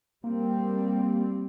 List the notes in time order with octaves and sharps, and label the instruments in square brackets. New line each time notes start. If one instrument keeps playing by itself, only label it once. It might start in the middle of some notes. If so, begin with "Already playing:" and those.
[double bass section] G3 C4 [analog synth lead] A#3